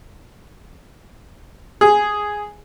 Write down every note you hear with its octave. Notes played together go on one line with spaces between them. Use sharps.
G#4